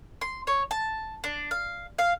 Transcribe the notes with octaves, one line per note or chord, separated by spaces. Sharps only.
C6
C#5
A5
D4
F5
F5